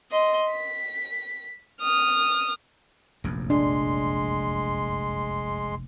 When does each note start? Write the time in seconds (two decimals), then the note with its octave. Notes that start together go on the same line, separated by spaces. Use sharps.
0.11 D#5 C6
0.50 B6
1.82 D#6 F6
3.24 F1 A#1 F#2
3.50 G#3 D4 C6